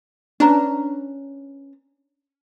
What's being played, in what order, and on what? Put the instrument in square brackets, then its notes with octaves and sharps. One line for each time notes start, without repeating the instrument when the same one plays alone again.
[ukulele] C#4 B4 A#5 [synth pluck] D4